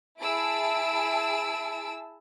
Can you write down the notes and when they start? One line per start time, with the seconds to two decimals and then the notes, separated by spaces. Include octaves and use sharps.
0.21 E4 G#4 A5 E6 D7